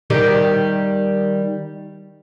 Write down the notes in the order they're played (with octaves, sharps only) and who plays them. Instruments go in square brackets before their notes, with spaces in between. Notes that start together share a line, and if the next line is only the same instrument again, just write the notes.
[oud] D#3 G3 G4